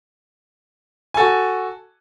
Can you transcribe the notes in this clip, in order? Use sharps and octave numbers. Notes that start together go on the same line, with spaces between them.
F#4 A4 G#5